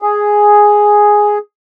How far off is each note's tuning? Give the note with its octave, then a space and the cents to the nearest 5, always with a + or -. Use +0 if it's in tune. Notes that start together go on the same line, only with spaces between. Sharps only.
G#4 +0